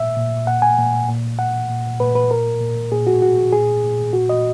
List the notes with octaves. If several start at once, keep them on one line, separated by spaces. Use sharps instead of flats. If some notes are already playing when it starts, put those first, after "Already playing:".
Already playing: A#2 E5
A#2
A#2 F#5
G#5
A#2
A#2
A#2 F#5
A#2
A#2 B4
B4
A#2 A#4
A#2
A#2 G#4
F#4
A#2 F#4
A#2 G#4
A#2
A#2 F#4
D#5